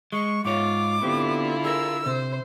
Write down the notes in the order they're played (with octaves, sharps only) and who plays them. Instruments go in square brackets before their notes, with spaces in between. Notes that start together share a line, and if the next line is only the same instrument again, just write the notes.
[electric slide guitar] G#3 [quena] C#6
[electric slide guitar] G#2 C#5 [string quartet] F4 [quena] D6
[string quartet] D3 E4 F4 [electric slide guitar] B3 C4 G4
[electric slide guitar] G#4 A#4 [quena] E6
[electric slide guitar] C3 [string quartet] C5